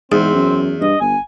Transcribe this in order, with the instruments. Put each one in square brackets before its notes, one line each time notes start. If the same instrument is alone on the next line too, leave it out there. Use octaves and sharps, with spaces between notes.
[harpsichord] E2 [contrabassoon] G#2 [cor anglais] C4 [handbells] G#4
[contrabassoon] F#2
[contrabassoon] G2 [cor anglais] D#5
[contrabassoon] G1 [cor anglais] G#5